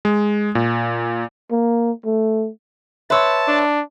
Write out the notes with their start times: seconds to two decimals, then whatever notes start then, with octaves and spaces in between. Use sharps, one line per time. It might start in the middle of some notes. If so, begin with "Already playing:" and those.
0.05 G#3
0.55 A#2
1.51 A#3
2.05 A3
3.10 B4 C#5 E5 A5 C6 E6
3.48 D4